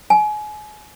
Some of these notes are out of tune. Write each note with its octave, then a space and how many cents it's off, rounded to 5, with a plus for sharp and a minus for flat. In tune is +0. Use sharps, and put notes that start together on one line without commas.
G#5 +30